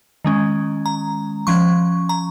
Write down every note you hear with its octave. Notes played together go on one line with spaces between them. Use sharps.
D#3 G#3 C#4
A#5
F3 C#4 C#6
A#5